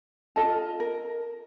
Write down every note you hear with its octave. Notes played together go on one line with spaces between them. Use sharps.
F4 A4 D#5 A5
A#4